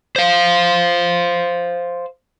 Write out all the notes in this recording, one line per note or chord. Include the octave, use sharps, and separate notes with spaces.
C5 F5